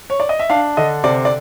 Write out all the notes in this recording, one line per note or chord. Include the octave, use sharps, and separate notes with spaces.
C#5
D5
D#5
E5
D4 F5
D3 D#5
C3 D5
D5